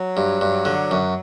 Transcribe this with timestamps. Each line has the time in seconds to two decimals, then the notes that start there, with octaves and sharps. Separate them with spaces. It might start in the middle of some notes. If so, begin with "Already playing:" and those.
Already playing: F#3
0.17 G2
0.41 G2
0.65 D3
0.91 F#2